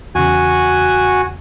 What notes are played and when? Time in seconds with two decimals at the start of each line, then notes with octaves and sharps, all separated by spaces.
0.15 E2 C#3 F#4 G#5